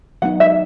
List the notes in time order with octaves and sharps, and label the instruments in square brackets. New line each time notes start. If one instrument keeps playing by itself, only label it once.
[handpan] F#3 B3 D#4 [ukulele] F#5
[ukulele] E5